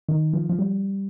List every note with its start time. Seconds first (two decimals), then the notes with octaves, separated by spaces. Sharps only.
0.08 D#3
0.33 F3
0.49 F3
0.59 G3